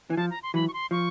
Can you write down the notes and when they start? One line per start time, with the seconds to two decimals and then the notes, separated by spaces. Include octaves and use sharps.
0.10 E3 G#5
0.17 F3 A5
0.30 A#5
0.43 C6
0.54 E3 F#3 B5
0.68 C#6
0.73 C6
0.91 F3 C#6